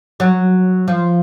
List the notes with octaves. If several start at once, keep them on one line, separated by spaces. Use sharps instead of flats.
F#3
F3